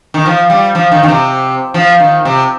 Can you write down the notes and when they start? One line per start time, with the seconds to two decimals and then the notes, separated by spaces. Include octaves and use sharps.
0.14 D#3
0.26 F3
0.50 G3
0.75 F3
0.92 D#3
1.03 D#3
1.08 C3
1.74 F3
2.00 D#3
2.25 C3